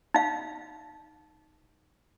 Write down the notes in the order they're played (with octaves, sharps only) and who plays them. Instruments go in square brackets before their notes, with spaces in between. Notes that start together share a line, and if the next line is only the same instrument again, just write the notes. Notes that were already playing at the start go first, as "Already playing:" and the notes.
[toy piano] D#4 F5